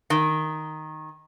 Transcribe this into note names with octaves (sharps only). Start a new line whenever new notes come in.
D#3